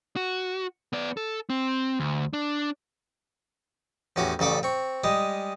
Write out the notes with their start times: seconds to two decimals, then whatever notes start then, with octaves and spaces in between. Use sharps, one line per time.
0.16 F#4
0.93 B3 D5
1.17 A4
1.50 C4
2.00 D2
2.33 D4
4.16 E2 A2 C#4 F#4 G4
4.39 A1 C#3 A4 D5 G5
4.63 C4 C#6
5.04 G3 G#3 D#5